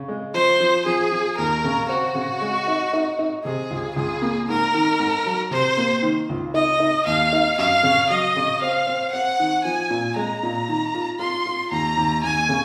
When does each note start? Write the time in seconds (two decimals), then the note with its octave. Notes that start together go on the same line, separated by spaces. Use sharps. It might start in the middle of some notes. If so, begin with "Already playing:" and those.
Already playing: C#3
0.08 G#3
0.34 F3 C5
0.60 F3
0.86 F3 G#4
1.12 F3
1.38 D#2 A#4
1.64 C#3
1.89 C4 F#4
2.15 C#3
2.41 G#3
2.68 D#4
2.93 D#4
3.19 D#4
3.45 C3 G#4
3.71 C#2
3.96 C#2 G#4
4.22 A#3
4.48 G#2 A#4
4.74 D#3
5.00 G#2
5.26 F#3
5.51 C3 C5
5.77 A#3
6.03 D#3
6.29 C#2
6.54 D#4 D#5
6.80 D#4
7.06 D#2 F5
7.33 D#4
7.58 F#2 F5
7.83 C#3
8.10 F#3 D#5
8.36 C#3
8.62 C4 F5
8.87 C4
9.13 C4 F#5
9.40 D#3
9.64 F3 G#5
9.90 A#2
10.16 G#3 A#5
10.43 A#2
10.69 D#3
10.95 F4
11.19 F4 C6
11.46 F4
11.71 D#2 A#5
11.97 D#2
12.24 D#2 G#5
12.49 C#3